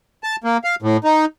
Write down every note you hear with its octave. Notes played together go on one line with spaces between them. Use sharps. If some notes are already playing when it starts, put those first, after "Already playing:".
A5
A#3
F5
A2
D#4